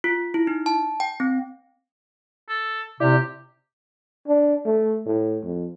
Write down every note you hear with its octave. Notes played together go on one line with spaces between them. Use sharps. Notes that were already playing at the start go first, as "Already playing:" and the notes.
F4
E4
D#4
A5
G5
C4
A4
C3 E4 G4 D5
D4
A3
A2
F2